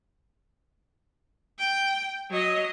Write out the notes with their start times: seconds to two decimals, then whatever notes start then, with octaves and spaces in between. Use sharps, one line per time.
1.59 G5
2.31 F#3 D#5